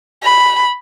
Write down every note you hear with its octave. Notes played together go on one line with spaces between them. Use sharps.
B5